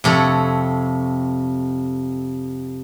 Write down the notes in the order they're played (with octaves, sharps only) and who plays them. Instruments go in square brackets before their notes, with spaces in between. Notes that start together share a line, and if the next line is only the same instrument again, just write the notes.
[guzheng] F2 C3 A4 C#5